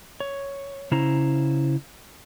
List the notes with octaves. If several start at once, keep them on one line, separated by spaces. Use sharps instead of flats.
C#5
C#3 C#4 E4 C5 A#5